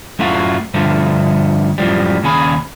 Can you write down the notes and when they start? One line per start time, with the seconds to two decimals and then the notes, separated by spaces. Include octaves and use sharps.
0.19 F#2 A2 A3 F4 F#4
0.74 G2 D3 F3 A3
1.78 F#2 A2 F3 G3
2.24 D#2 C#3 C#4 G#4 B5